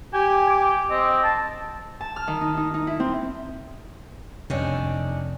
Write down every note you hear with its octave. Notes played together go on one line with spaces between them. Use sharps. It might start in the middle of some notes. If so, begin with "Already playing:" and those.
G4 G#5
D6
C4 D#5
A5
A5
F6
D#3
D#4
D#4
D#4
E4
C4
F2 C3 D#3 C#4 D4